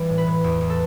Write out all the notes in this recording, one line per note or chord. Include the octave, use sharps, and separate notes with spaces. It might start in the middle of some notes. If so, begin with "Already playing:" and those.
Already playing: E3 G3 D5
A2
B4
A2
E2 G4
E2
A4